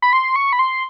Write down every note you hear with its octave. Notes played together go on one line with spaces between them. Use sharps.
B5
C6
C#6
B5
C6